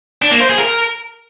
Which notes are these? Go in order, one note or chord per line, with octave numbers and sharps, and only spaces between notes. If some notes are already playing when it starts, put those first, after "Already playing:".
D4
A#3
C5
G#4
A#4